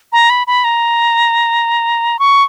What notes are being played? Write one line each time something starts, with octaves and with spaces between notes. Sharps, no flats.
A#5
B5
B5
A#5
C#6